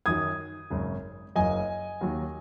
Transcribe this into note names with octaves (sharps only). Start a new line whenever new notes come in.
F#2 D#3 F#3 D#6 G#6
G#1 F#2 C#3
F#1 F#2 F#3 D#5 G#5
D#2 D#3 F#3